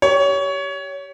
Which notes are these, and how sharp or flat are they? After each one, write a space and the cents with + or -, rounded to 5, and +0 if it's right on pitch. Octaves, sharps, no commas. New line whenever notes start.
G4 -10 C#5 +20